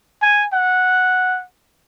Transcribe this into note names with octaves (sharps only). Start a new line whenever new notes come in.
G#5
F#5